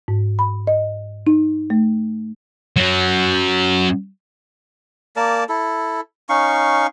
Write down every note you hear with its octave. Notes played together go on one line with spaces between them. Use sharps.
G#2
B5
D#5
D#4
A3
F#3 C#4
A#3 A#4 D5 A5
E4 A4
C#4 D#4 F5 C#6